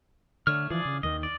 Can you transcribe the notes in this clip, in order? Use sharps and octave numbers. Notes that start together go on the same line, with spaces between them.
D3 A3 C#5 F6
E3 F3 G#4 D5
C#3
D#2 D#3 D#5
D5